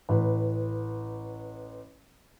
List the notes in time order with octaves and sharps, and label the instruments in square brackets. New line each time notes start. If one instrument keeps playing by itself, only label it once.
[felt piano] A1 B4